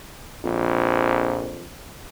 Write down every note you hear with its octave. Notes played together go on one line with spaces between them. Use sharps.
A#1 F2